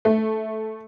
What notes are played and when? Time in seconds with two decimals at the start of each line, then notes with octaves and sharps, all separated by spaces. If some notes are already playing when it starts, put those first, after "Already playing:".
0.05 A3